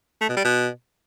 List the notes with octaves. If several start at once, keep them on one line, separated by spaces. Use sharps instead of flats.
A3
B2
G3
B2